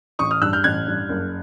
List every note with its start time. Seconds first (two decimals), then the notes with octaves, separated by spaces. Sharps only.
0.19 A1 C#6 D#6
0.31 D#6 F6
0.42 G2 E6 F#6
0.53 F6 G6
0.64 A1 F#6 G#6
0.87 G2
1.09 F#1